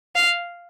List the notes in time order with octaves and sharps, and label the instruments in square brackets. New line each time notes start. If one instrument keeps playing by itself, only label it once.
[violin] F5